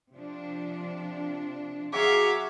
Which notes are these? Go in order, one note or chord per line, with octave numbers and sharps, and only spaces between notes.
C3 F3 D4
F#3 F#4 G#4 C#5 E5 F5 D6